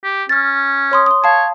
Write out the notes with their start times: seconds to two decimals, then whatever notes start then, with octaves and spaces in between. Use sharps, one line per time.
0.04 G4
0.29 C#4 F6 A6
0.92 C#5 C6 D#6
1.06 C6 D#6
1.24 C#5 F5 A5